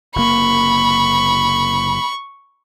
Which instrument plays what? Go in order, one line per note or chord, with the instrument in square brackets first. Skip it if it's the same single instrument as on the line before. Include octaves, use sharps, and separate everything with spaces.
[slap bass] F#1 C3 A#3 [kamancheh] B5 [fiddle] C#6